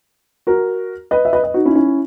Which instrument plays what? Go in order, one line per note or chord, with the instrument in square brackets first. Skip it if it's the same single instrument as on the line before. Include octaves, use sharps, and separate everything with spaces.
[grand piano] F#4 A#4
B4 D#5
E5
B4 D#5
B4 D#5
D#4 F#4
C#4 E4
D#4
C#4 E4